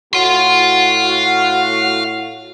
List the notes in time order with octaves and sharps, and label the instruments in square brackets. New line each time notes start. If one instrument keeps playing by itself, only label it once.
[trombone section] A2 F#4 [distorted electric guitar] F5 C6